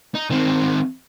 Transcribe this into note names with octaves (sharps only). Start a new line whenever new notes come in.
D#4
D#3 C4